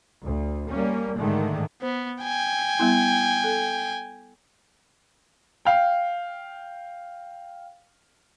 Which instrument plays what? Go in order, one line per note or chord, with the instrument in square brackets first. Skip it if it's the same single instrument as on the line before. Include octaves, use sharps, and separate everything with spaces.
[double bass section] D2
G3 A#3 C#4
G#2 D3 D#3 G#3 A3
[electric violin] B3 [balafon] C5
[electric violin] G5 G#5
[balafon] G3 B3 E4
A4
[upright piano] F5 G5